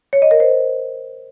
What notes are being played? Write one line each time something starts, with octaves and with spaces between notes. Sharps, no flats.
C#5
D#5
A#4
C5